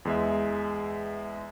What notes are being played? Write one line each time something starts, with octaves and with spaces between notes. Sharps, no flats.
E2 G#3 E5